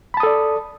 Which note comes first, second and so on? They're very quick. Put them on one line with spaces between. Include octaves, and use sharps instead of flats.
B5 A5 D#6 A4 D5